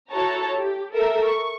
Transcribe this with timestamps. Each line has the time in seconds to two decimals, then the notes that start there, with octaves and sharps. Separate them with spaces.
0.11 E4 F#4 A4 C#5 A5 A#5
0.57 G4
0.92 A4 A#4 E5
1.24 C#6